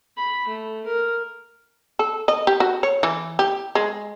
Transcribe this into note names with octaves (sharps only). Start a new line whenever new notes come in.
B5
A3
A#4
A4
D#5
G4
F#4
C#5
E3
G4
G#3